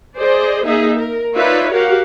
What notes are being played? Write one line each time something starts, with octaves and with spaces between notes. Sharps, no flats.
G#4 C5 D5 D#5
A#3 D#4 G#4 E5
A#4
D#4 F4 B4 C#5 D5 E5
F#4 G4 A#4 F5 F#5